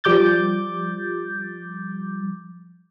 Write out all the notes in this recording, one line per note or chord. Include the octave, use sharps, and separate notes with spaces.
F3 G3 D6 G6 A6